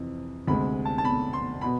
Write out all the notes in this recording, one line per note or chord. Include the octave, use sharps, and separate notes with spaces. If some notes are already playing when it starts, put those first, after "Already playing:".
Already playing: F2 C3 E3
D2 C3 G#3 B5
A5
A5
B5
C6
B2 B5